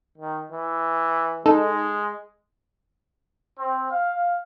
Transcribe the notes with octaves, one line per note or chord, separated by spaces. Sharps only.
D#3
E3
G#3 D#4 A4
C4
F5